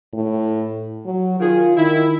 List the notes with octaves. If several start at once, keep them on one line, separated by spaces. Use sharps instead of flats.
A2
F#3
D#3 F4 G#4
D#3 E4